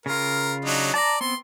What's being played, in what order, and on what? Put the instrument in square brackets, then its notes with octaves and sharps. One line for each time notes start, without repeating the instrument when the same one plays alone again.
[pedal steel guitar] C#3 F4 [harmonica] A#4
[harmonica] F#3 D4 D#4
[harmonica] D5 [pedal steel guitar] A5 A#5
[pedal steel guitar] B3 C4 [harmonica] C6